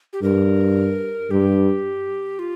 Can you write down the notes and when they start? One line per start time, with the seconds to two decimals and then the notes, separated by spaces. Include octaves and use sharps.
0.13 G4
0.22 G2 A#4
1.31 G2 G4
2.39 F4